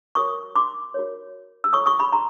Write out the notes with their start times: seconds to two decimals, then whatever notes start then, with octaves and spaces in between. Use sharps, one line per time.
0.15 F#4 A#4 C#5 C#6 D#6
0.56 C6 D6
0.94 F#4 A#4 C#5
1.64 E6
1.73 F4 A4 C#5 C#6 D#6
1.86 C#6 D#6
1.99 B5 C#6
2.12 A#5 C6